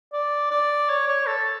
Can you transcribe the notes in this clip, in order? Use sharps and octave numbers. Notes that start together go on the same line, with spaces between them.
D5
D5
C#5
C#5
A4